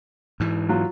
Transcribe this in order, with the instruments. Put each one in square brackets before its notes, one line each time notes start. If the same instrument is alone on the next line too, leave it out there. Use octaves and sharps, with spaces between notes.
[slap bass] G#2 E3
[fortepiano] F#3 F4